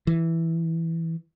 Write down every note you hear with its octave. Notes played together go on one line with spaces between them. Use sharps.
E3